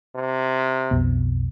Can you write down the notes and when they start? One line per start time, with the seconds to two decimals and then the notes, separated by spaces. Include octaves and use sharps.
0.15 C3
0.91 B1 F2 B2